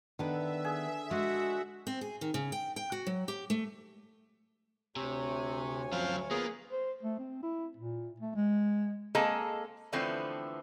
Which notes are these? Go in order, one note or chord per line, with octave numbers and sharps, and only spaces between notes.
D3 D#3 B3 B4 E5
G#4
G#3 F#4
C4
G#4
D#3
C#3
G5
G5
F#4
F#3
G4
A3
D2 C3 G4 C#5 G#5
F#2 F3 F#3 C4 F5
A#3 B3 F4 G#4
C5
A3
C4
E4
A#2
A3
G#3
A#3 C4 G#4 A4 D#5 A#5
D3 E3 F3 A3 B3 C4